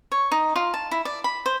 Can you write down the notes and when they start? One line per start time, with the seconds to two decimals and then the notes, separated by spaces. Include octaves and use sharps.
0.12 C#5
0.32 D#4
0.56 F4
0.74 A5
0.91 E4
1.05 D5
1.24 B5
1.46 C5